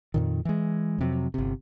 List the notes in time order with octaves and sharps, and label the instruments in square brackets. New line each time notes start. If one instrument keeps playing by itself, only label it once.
[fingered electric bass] F2 A#2 D#3
E3 G#3
F2 C3 F#3
G1 C3